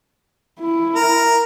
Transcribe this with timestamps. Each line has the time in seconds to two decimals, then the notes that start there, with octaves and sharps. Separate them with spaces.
0.60 E4
0.95 A#4